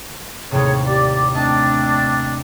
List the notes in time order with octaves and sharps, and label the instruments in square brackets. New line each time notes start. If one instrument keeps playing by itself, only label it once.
[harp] D#2 A2 C3 [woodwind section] G#4 C#5
[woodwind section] G4 D5
[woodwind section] A3 C4 D4 [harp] D#5 A5